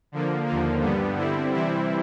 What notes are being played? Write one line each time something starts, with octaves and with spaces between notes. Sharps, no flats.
D3 F3 A#3
D#2 D3 F3 A#3
G2 D3 G3 B3
D3 G3 C4 E4
C3 E3 G3 C4 E4